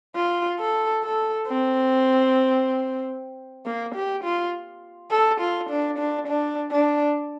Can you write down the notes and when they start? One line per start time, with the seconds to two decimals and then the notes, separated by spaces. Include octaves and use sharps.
0.16 F4
0.60 A4
1.03 A4
1.47 C4
3.66 A#3
3.95 G4
4.24 F4
5.11 A4
5.41 F4
5.70 D4
5.99 D4
6.28 D4
6.72 D4